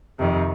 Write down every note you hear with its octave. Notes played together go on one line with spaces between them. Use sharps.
F2 C3 D#3